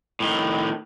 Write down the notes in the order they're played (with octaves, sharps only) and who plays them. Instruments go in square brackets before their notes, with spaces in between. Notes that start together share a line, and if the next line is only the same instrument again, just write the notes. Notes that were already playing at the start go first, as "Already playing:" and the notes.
[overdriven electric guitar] A2 D#3